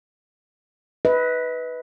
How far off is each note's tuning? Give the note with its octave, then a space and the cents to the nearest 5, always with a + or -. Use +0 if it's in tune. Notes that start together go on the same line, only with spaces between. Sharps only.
B4 +0 D#5 +40